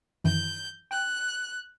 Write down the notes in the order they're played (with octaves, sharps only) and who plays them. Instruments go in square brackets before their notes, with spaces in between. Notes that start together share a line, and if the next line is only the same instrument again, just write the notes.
[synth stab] F#2 D#3 E3 [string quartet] G6
[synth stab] G5 [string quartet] F#6